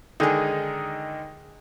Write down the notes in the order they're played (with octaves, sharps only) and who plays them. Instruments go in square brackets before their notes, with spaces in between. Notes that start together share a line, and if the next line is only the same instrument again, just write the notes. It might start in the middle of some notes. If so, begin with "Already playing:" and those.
[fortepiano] D3 D#3 D#4 [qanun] G#3 G#4